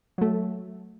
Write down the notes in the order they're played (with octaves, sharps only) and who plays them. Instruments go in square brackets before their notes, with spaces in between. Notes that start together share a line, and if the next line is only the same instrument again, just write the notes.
[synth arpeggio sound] F#3 A3